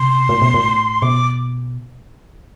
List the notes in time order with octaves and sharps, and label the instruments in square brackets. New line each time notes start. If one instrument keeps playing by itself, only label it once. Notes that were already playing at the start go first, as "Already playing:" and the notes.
Already playing: [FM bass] C3 [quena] C6
[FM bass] A2
B2
A2
[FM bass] B2 [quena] D6